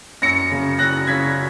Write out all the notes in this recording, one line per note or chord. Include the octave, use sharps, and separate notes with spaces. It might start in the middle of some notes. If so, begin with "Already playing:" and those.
F#2 A#6 C#7
C#3
C#3 F#6 A#6
C#3 G#6 B6